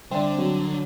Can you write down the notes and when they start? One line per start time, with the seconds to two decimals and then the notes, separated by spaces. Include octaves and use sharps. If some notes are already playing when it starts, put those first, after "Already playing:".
0.11 D3 G3 C4 D5
0.38 F#3